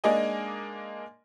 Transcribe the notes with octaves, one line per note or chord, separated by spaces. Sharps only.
G#3 A#3 D4 D#4 D#5 G#5